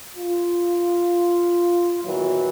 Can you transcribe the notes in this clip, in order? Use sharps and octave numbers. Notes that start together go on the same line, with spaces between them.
F4
E2 A#2 D#3 E3 F#3